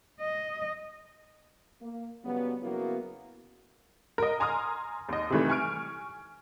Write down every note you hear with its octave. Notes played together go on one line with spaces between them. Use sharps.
D#5
A#3
C#3 F#3 G3 B3
C#3 F#3 A#3 B3 E4 F#4
A#4 D#5
G#5 A#5 C6 D#6 F6
D#2 D#5
C3 D#3 E3 G3 A3
G#5 C#6 F6 D7